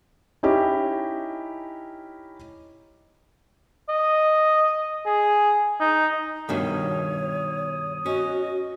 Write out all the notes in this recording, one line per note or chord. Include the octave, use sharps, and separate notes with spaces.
C#4 D#4 E4 G4 C#5
D#5
G#4
D#4
G2 B2 D#3 C#5 D#6
C#4 F#4 D#5